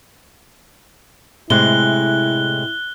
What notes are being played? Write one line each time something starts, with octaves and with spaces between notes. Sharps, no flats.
A2 C3 G#3 E4 F#6 G7